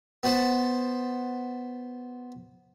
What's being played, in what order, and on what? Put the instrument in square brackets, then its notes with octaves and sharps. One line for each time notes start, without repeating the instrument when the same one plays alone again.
[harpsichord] B3 F#4 C5 A5